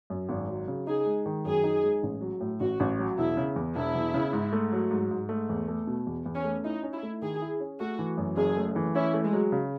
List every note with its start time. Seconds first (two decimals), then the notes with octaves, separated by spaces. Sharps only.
0.10 F#2
0.29 G#1
0.48 F#3
0.68 C#3
0.87 D#4 G#4
1.06 G#3
1.26 D#3
1.45 F#2 G#4
1.64 D#4
1.83 G#3
2.03 A1
2.21 F#3
2.41 A2
2.60 A1 F#4
2.80 A1
2.99 F#3
3.18 E1 E4
3.37 C#3
3.56 E2
3.75 E1 E4
3.95 E1
4.14 C#3
4.33 G#2
4.53 A3
4.72 F#3
4.91 G#2
5.11 G#2
5.29 A3
5.49 E2
5.68 A3
5.87 B2
6.07 E2
6.26 E2
6.35 C#4
6.44 A3
6.64 D#4 E4
6.83 C#4
6.93 E4
7.03 A3
7.22 D#3 G#4
7.42 E4
7.60 C#4
7.80 A3 F#4
7.99 E3
8.17 F#2
8.37 F#1 G#4
8.57 A3
8.76 E3
8.95 C#4 E4
9.14 A3
9.24 G#3
9.33 F#3
9.52 C#3